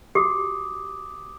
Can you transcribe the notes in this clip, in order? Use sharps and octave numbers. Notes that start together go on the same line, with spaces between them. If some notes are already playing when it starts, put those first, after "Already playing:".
F#4 G4 D6 D#6